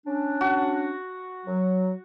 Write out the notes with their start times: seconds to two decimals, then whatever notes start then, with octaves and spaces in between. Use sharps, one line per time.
0.05 C#4 D4
0.41 F#4
1.45 F#3